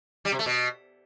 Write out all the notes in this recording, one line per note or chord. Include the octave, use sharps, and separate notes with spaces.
G3
C3
A3
B2